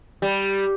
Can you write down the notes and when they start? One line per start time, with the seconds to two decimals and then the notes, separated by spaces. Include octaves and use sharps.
0.22 G3